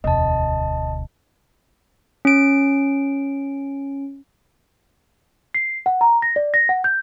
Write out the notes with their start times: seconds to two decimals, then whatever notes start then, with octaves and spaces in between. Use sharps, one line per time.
0.04 E1 D2 D#5 A5
2.25 C#4 D7
5.55 C7
5.86 F#5
6.01 A#5
6.22 A#6
6.36 D5
6.54 A#6
6.69 F#5
6.84 G6